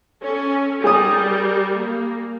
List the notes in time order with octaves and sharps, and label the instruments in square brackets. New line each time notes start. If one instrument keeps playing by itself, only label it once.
[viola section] C#4 A4
[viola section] G3 A#4 [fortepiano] G#4 D#6
[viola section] A#3